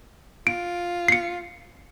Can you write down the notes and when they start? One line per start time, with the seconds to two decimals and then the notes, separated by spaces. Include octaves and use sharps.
0.47 F4 D7
1.08 C7 C#7